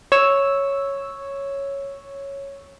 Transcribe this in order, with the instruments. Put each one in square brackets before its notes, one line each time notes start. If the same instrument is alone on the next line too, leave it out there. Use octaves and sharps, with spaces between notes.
[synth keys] C#5 E6